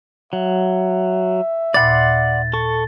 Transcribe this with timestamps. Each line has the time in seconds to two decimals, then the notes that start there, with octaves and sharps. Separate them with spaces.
0.33 F#3 E5
1.74 D#2 A#2 D5 F#5 B5 C6 A6
2.53 A4 C#6